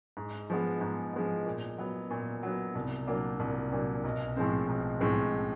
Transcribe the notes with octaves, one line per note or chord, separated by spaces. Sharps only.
G#2
F3 G#3 B3
G#2
F3 G#3 B3
A#2
F#3 B3
A#2
F#3 B3
C2
A#2 F#3 A#3 D4
C2
A#2 F#3 A#3 D4
B1
A2 F3 G#3 C4
B1
A2 F3 G#3 C4